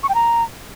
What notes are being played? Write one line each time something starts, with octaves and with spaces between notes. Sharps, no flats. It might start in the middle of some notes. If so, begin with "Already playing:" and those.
C#6
G5
A#5